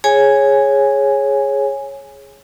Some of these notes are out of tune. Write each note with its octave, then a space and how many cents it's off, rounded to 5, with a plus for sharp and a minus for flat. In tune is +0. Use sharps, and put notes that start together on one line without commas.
G#4 +0 C#5 -10 G#5 +0